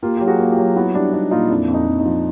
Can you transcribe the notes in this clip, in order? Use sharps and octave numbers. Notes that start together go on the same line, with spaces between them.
A#3 F4 G4
F#3 G4
F#4 G#4
A#3
F4 G4
F#3
B3 E4 F#4
G3 D4 E4
D4 D#4
A#2 D#4 F4
F2 D4 E4
F2
D#4
F2
D#4
F3